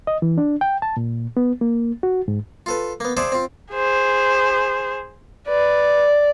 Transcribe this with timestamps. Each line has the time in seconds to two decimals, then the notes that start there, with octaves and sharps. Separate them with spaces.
0.07 D#5
0.22 E3
0.38 D4
0.61 G5
0.82 A5
0.97 A#2
1.37 B3
1.61 A#3
2.03 F#4
2.28 G#2
2.66 F4 A4 B4
3.00 A#3 B3
3.17 G#4 C5 D5 E5 F#5 A5
3.32 C4 F4
3.72 G#4 C5
5.48 B4 D5